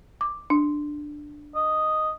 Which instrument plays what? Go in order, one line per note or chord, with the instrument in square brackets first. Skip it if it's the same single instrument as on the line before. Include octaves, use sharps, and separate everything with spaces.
[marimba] D6
D4
[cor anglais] D#5